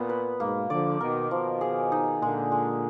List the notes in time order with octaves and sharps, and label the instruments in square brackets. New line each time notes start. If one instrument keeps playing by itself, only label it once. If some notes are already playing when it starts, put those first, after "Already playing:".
Already playing: [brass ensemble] A#2 [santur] B3
[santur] B4
[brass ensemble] G#2 B2 [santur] A#3
[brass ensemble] D3 F3 [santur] D5
[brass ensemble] B2 D#3 [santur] A#4
[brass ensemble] B2 D#3 [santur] F3
[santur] G#4
D#4
[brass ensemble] A#2 D3 [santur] G#3
[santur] G#3